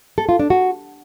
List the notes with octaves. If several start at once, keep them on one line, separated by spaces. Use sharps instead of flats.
A4
F4
D4
F#4